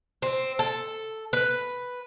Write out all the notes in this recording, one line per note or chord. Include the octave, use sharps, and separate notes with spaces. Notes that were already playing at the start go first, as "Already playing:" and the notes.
C4
A4
B4